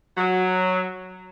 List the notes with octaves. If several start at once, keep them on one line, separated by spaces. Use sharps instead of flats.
F#3